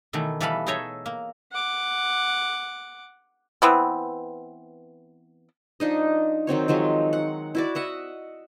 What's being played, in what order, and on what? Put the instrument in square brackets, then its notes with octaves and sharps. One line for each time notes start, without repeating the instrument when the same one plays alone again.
[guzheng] B2 D#3 E3 A3 C#5
E3 G3 A4 B4 F5 B5
D#4 G#4 A4 C#5 D#5 E5
A#3
[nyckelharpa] F#5 D6
[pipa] E3 B3 C4
[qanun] F3 D4 D#4 D#5
D#3 F#3 C4 C#5
D#3 F3 F#3 G#3
F#5
E4 F#4 D5
D#5 E5 F#5